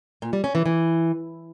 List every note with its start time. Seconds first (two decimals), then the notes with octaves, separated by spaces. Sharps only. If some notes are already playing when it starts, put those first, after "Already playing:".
0.22 A#2
0.33 G3
0.44 C#4
0.55 E3
0.66 E3